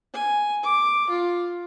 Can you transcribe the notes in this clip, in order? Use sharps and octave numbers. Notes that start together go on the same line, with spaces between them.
G#5
D6
F4